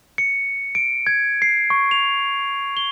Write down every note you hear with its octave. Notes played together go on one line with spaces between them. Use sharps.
C#7
D7
G#6
C7
C#6
F7
G7